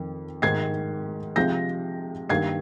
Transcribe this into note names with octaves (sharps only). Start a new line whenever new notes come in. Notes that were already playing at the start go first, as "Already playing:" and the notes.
Already playing: F2 D#3
G#2 D#3 G#3 G#6 C7
C3 F3 G#3 G6 A#6
G2 D#3 A#3 G#6 C7